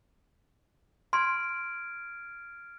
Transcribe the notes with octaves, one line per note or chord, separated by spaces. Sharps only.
C6 F6 G#6 D7